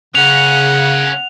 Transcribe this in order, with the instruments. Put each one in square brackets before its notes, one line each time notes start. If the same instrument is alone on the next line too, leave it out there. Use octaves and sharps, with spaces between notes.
[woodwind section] C#3 [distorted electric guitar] A#3 C#4 [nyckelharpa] F#5 [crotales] F7